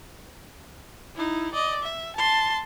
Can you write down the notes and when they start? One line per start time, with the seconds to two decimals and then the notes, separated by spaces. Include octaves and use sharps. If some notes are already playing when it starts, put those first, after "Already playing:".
1.15 D#4 E4
1.53 D5 D#5
1.83 E5
2.16 A5 C6